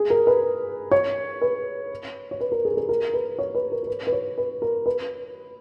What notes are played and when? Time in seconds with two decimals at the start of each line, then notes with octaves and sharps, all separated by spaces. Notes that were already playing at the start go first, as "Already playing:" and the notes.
Already playing: G#4
0.10 A#4
0.27 B4
0.91 C#5
1.41 B4
2.31 C#5
2.40 B4
2.52 A#4
2.65 G#4
2.72 A#4
2.77 G#4
2.89 A#4
3.13 B4
3.39 C#5
3.55 B4
3.72 A#4
3.83 A#4
3.87 B4
4.07 B4
4.12 C#5
4.38 B4
4.62 A#4
4.86 B4